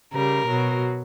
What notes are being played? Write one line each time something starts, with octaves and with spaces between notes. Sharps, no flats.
C#3 G3 A#4
B2 F#3